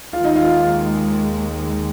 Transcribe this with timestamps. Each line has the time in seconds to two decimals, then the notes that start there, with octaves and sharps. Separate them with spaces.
0.12 D#2 D#3 G#3 F4
0.24 D#4
0.36 F4